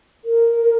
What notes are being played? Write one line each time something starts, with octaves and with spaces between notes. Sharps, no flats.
A#4